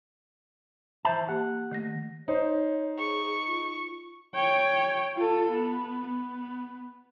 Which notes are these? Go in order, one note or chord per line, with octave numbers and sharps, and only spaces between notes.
E3 C5 E5 A5
A#3 G4 F#5
D#3 A3 A#6
D#4 C5 C#5
G#4 C#6
F4
C#5 G5
F4 A4
B3
B3